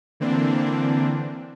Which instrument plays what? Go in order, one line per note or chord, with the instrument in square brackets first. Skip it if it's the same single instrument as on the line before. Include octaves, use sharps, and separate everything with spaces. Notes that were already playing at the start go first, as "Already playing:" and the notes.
[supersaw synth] D3 E3 A#3 C4 D4